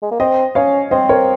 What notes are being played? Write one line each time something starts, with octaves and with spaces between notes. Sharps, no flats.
G#3
A#3
C4 C5 D#5
C#4 C#5 F5
C4 C5 D#5
A#4 C#5